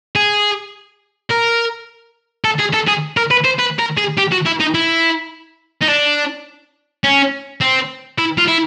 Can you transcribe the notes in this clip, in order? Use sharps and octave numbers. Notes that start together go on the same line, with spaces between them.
G#4
A#4
A4
G#4
A4
G#4
A#4
B4
C5
B4
A#4
G#4
G4
F#4
E4
D#4
E4
D#4
D4
C#4
C4
E4
F4
E4